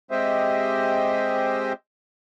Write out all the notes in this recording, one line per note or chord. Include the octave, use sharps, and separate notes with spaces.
G#3 C4 G4 C5 D#5 E5